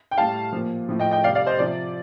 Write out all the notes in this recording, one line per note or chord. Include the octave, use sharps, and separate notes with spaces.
G5
A2 G3 F5 A5
A#2 F3
A2 F3
D#5 G5
D#5 G5
C3 G3 D5 F5
D5 F5
C5 D#5
C3 F3 D5